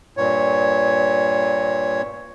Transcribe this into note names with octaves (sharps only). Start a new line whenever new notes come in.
G2 A#2 C#5